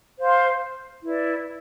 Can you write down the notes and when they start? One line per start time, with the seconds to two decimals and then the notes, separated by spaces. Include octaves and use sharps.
0.18 C5 F5 C6
1.04 E4 B4 D5